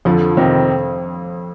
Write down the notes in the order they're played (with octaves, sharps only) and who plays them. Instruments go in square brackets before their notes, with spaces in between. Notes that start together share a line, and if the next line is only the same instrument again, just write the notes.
[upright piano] F2 [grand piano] D3 F3
[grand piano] C3 D#3 [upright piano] C4